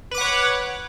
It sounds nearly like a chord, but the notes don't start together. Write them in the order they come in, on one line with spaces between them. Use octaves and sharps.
B4 D6 F#5 C#5